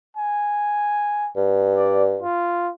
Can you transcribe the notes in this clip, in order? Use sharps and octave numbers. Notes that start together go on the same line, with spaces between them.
G#5
G2
D5
F4